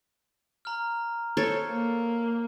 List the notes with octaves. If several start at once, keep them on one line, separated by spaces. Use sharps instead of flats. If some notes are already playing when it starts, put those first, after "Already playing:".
A#5 F6
A4 C5 C#5
A#3